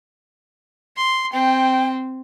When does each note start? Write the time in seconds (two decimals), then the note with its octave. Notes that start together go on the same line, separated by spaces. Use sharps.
0.96 C6
1.33 C4 G5